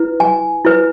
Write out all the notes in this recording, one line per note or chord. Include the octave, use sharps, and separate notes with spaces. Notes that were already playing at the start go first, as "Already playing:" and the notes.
Already playing: E4 B4
G#5
E4 B4